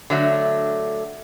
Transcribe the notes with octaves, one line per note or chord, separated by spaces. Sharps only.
D3 F#3 A3